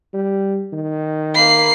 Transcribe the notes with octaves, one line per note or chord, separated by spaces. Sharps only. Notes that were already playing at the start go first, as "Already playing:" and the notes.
G3
D#3
A#3 B5 C7